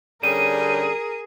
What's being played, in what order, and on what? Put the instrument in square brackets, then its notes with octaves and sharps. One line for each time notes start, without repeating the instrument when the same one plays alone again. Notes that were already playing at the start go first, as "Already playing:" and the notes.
[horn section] D3 G3 C#4 [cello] G#4 [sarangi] A#4 [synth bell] D#7